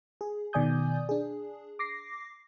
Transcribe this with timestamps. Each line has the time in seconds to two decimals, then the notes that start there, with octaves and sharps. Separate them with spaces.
0.21 G#4
0.53 B2 D#3 D5 G#5 D#6 G6
1.09 D4 G#4
1.79 D6 A#6 C7